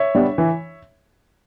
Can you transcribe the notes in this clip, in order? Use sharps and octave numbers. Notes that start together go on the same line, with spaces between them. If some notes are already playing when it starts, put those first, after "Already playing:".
Already playing: C#5 E5
G3 B3 D4
E3